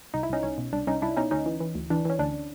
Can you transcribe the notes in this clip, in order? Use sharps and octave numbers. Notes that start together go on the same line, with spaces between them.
C2 D#4
E4
C2 C#4 D#4
C2 C#4
B2
C2 D4
C2 C#4 D#4
C2 D4 E4
B2 C#4 D#4
D2 C#4 D#4
E3
E3
D2
E3 D4
E3 C#4
D2 D4